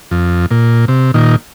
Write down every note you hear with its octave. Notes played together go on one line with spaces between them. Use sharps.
F2
A#2
C3
A#2 D#3